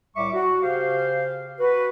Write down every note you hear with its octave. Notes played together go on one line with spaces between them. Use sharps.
C2 A2 G3 E5 C#6 D6
F#4
C#3 G4 C5 F5
F#4 B4